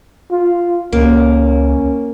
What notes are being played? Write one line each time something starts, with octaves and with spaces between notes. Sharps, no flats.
F4
C#2 A#3 C#4